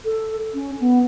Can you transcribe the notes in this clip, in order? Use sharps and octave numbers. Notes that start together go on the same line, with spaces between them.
A4
C#4
B3